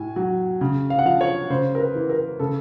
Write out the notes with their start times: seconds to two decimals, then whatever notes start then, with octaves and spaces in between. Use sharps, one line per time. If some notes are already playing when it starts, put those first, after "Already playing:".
Already playing: A2 G#5
0.16 F#3
0.61 C#3
0.90 F5
0.99 F#5
1.05 F3 F5
1.21 C#5
1.50 C#3 C5
1.75 A#4
1.80 B4
1.95 E3
2.10 A#4
2.39 C#3 A4